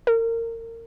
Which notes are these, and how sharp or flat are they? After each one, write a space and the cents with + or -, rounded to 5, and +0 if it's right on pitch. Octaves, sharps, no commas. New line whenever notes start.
A#4 -30